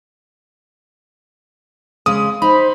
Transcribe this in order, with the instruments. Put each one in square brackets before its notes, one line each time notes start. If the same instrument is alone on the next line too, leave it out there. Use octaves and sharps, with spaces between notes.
[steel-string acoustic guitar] C#3 G#3 [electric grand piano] D#6
[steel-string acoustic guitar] D#4 [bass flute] C5 [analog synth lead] B5